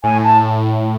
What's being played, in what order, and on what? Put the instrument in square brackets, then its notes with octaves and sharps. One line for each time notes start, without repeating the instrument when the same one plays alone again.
[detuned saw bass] A2 [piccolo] G#5
[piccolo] A5